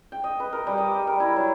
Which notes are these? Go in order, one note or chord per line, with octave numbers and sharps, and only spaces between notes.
G5
D#5
B4
A#4
G3
D#5
E5
A#4
E4
F#3